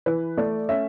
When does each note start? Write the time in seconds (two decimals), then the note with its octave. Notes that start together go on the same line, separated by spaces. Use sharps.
0.06 E3 B4
0.37 A3 D5
0.69 C#4 E5